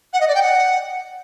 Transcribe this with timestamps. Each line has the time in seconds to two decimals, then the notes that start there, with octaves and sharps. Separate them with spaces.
0.13 F#5
0.20 D#5
0.27 D5
0.35 G5
0.42 F#5